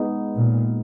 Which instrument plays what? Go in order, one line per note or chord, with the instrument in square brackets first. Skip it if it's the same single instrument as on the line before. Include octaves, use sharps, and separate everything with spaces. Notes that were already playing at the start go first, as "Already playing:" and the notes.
Already playing: [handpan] G#3 B3 D#4
[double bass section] A#2